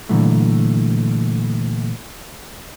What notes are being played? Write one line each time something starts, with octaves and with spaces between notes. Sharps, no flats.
A#2 D3 E3 F#3 A3